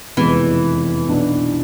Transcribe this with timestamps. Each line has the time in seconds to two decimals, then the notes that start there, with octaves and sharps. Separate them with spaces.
0.17 F1 E2 B2 E3 G#3
1.09 B1 B2 B3 D4